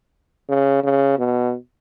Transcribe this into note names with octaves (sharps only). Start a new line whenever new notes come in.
C#3
C#3
B2